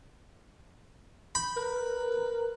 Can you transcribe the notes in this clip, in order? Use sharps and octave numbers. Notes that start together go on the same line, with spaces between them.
B5 G6
A#4 B4